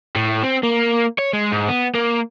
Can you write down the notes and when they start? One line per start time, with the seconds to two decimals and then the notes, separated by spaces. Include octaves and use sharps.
0.16 A2
0.43 C4
0.63 A#3
1.18 C#5
1.33 G#3
1.52 G#2
1.68 B3
1.94 A#3